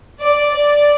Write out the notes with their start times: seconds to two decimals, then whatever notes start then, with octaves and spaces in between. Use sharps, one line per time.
0.22 D5
0.57 D5